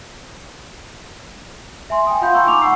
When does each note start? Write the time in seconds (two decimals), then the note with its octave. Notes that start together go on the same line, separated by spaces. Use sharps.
1.90 E5 G#5 C6
2.07 G5 G#5 D#6
2.21 F4 F5 F#5 B5 C6 G6
2.34 G5 A#5 C6 C#6 E6 G6
2.46 D#4 G#5 C#6 D6 F7
2.62 F#5 B5 C#6 E6 C7